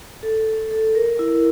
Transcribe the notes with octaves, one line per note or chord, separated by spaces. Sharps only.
A4
A4
A4
A#4
E4